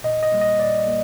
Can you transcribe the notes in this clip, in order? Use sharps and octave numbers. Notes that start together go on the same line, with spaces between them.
A#2 D#5
D#5
G3 A#3
D#5
A#2 D5
G3 A#3